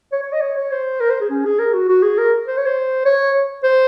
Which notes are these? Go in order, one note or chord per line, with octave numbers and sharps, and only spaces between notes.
C#5
C#5
D#5
C#5
C#5
C5
A#4
C5
G#4
C#4
G#4
A#4
F#4
F#4
G#4
A#4
C5
C#5
C5
C#5
C5